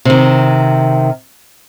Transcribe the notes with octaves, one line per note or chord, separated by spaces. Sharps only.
C3 D#3